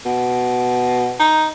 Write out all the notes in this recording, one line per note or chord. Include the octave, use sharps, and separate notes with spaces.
B2
D#4